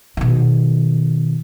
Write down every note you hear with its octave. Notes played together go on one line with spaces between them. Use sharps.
B2 D#3